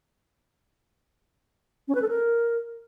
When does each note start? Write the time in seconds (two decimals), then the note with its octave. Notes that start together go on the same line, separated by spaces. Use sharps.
1.88 C#4
1.95 B4
2.02 A4
2.09 A#4